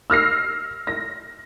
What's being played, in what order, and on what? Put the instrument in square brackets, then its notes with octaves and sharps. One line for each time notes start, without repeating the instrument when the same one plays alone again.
[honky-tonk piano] E6 F6 A#6 C7
A#6